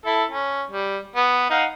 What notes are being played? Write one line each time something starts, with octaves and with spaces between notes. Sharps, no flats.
E4 A4
C#4
G3
B3
D#4 F5 F#5